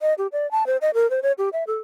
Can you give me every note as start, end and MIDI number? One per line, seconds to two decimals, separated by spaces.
0.02 0.14 75
0.18 0.27 67
0.32 0.50 74
0.51 0.66 81
0.66 0.77 72
0.81 0.91 75
0.94 1.09 70
1.10 1.20 72
1.23 1.32 73
1.38 1.49 67
1.53 1.64 76
1.67 1.80 69